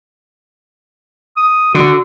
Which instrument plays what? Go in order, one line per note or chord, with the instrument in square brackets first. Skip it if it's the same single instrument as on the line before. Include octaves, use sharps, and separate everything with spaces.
[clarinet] D#6
[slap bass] D3 [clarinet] F#4